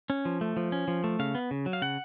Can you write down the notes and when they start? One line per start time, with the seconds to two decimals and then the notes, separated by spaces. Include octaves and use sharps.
0.10 C#4
0.25 F3
0.41 A3
0.57 F3
0.72 C#4
0.88 F3
1.04 A3
1.19 C#3 F5
1.35 B3
1.51 C#3
1.66 F#3
1.73 F5
1.82 C#3 F#5